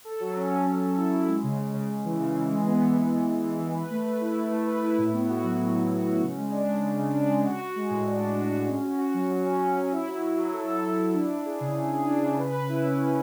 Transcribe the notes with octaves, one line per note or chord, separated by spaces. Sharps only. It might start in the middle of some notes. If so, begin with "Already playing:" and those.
A4
F#3
C#4
C#4
C#4
A4
E4
E4
G#3
C#3
C#3
C#3
C#3
E3
C#3
E3
G#3
B3
E3
B3
E3
E3
E3
E3
B4
A3
B4
E4
A3
A3
B4
E4
A2
B3
F#4
F#3
A2
A2
F#4
F#4
C#3
G#3
D4
G#3
C#3
C#3
D4
G#3
F#4
F#4
G#3
A2
D4
D4
F#4
G#3
C#4
F#4
F#4
F#3
F#3
C#4
C#4
F#3
E4
F#3
F#3
F#3
A4
A4
E4
E4
D4
D4
G#4
C#3
C#3
G#4
D4
C#3
B4
B4
E4
C#4
C#4